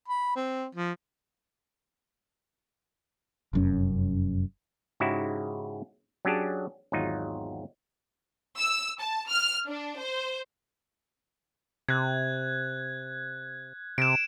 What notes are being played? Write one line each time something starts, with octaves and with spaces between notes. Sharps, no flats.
B5
C4
F3
F1 F#2 C#4
G#2 C#3 D#4 E4 F#4 G4
F#3 C#4 D4 G4 G#4 A5
G#1 E2 F#3 D#4 F4
E6
A5
F6
D4
C5
C3 F#6 G#6
C3 D7 E7